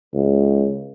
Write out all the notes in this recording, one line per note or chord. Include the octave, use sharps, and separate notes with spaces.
C#2